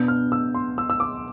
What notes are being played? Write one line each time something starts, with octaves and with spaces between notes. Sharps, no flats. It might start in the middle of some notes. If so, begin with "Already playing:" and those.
Already playing: B2 B3 D4 G6
F6
E6
C6
E6
E6
D6